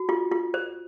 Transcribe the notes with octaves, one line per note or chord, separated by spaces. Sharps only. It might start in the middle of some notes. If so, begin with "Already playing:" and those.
Already playing: F#4
F4
F4
C5